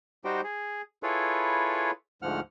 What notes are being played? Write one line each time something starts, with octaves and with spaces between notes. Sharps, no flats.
G3 D#4 F#4 G4 C5 G5
G#4
E4 F4 G#4 A4 B4 C#5
D2 G#2 F3 F#5 F6